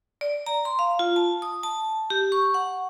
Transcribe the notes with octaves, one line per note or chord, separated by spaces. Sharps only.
D5
A#5
C6
F5
F4
A5
D#6
A5
G4
C#6
F#5